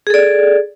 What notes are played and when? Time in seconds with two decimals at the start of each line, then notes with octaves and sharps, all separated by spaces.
0.07 G#4
0.10 A4
0.14 D5